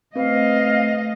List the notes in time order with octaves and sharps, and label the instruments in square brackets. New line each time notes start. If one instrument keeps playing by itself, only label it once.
[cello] A3 D#5 [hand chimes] C4 B4 [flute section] F5